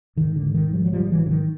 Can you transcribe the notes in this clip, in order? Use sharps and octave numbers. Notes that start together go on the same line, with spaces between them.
G#2 D#3
D3
G#2
D#3
G#2
F3 G3
F#3
G#2 F3 G3
F3
E3 F#3
G#2
D3
D#3